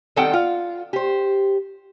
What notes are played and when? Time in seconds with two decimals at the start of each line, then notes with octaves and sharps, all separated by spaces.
0.16 D#3 G3 C4 A4 F#5 G5
0.33 F4
0.93 G4 C5